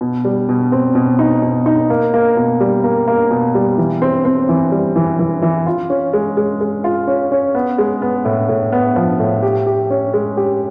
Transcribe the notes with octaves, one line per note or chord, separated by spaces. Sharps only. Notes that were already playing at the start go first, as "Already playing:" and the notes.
B2
G3
B2
C4
B2
D#4
B2
D#4
A#3
A#3
B2
G3
A#3
A#3
B2
G3
E3
C4
C4
E3
G3
E3
E3
E3
F4
C#4
G#3
G#3
G#3
F4
C#4
C#4
B3
G#3
B3
A2
A2
B3
F3
A2
G4
G4
C#4
G#3
G4